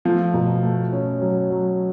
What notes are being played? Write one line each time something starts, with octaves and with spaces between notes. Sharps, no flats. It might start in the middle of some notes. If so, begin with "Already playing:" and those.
F3 A3
B2
A3
C#4
F#3
F#3